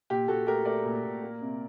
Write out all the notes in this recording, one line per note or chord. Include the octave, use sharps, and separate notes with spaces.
A#2 G4
A#2 F#4 A4
A3 G4 A#4
A3 A#4 D5
A#2
A#2
A#3
C3